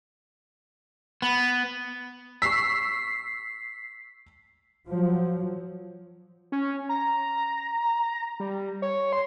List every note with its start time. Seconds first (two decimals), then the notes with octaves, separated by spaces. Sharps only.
1.22 B3
2.42 C#6 E6 B6 C7
4.87 F3 F#3
6.52 C#4
6.89 A#5
8.40 G3
8.82 C#5
9.13 C6